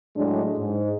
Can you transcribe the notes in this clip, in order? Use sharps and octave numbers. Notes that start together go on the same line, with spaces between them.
A2 F#3 G#3 D4
G#2